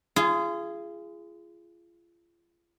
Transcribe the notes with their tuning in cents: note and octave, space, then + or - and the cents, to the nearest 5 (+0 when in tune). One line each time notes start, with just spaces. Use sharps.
F4 -35 G#4 +0